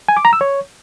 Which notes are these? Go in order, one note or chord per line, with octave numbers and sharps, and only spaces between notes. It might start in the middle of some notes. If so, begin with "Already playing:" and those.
G#5
D6
A#5
E6
C#5